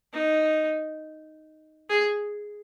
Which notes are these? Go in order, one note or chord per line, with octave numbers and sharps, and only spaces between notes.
D#4
G#4